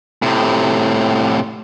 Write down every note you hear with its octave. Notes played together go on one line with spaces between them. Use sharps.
A2 C3